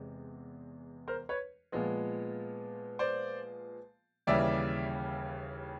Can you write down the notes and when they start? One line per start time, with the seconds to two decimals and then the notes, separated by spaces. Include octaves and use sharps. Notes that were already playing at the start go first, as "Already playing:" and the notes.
Already playing: E2 C3 G#3
1.08 A#4 C5
1.29 B4 C#5
1.72 A#2 F3 G#3 B3
2.99 C5 D5
4.27 D#2 C#3 E3 G3 D5 E5